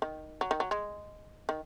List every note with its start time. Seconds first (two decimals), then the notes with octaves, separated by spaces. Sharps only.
0.02 D#3
0.41 F#3
0.51 D#3
0.60 F#3
0.71 G#3
1.49 D#3